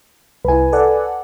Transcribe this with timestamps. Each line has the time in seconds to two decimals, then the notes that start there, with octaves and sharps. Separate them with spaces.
0.45 C2 E4 B4 G#5
0.73 A4 D5 F#5